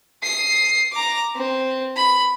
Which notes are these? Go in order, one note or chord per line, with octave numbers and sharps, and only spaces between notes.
D#6 C7
A#5 D6
C4
B5